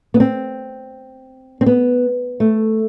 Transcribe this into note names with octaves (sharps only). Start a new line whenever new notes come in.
B3
C4
C4
B3
A3